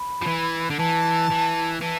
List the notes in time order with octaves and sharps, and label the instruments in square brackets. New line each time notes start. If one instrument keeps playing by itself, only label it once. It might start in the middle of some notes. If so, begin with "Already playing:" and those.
Already playing: [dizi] B5
[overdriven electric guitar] F3
E3
D3
[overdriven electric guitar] E3 [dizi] A5
[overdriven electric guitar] E3
[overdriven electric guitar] E3 [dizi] A5